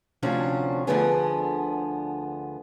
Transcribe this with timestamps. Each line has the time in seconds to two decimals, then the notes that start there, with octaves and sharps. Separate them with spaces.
0.22 D2 C3 F3 C#4 D4 F#4
0.87 D2 G2 D3 F3 B3 G#4